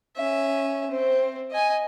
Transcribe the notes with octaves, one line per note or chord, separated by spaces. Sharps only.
C#4 E5
C4
D#5 G#5